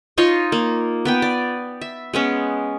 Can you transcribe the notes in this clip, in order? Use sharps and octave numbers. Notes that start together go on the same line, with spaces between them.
D#4 F4 C#5 D#5
A#3
B3 B4 G5
D5
E5
G#3 B3 C#4